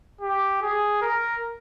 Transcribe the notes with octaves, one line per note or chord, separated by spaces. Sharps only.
G4
G#4
A#4